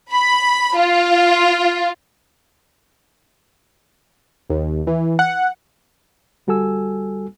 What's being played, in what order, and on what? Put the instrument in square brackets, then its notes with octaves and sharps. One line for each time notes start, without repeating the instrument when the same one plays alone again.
[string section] B5
F4
[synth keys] D#2
E3
F#5
[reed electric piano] D2 G3 F#4 A4 G#5 E6